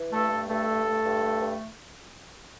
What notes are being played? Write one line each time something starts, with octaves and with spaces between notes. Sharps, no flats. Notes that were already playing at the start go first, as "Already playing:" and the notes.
Already playing: E3
G2 A3 A4
A3
G2 A3 A4
G2
A3
G2
A3
G2